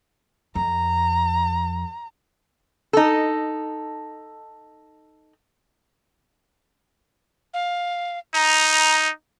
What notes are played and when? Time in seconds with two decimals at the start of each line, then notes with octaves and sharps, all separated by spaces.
0.55 F2 A#5
2.93 D#4 A4
7.54 F5
8.34 D#4 A#5